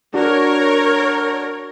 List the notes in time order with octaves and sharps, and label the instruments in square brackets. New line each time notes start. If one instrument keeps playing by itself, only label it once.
[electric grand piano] D4 F#4 [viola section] A#4 C#5